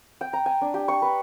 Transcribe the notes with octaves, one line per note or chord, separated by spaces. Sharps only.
G5
A#5
G#5
D4
G4
C#6
B4